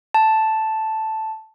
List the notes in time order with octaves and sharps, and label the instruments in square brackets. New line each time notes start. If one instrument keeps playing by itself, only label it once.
[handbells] A5